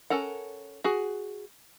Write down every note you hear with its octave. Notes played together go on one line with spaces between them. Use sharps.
C#4 A4 A#4 F#5
F#4 G#4